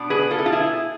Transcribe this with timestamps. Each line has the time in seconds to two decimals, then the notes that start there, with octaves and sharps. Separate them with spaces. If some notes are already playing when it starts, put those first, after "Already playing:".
Already playing: B2 B3 D4
0.10 G#4 B4
0.31 F4 A4
0.38 E4
0.46 F4
0.52 E4 G#4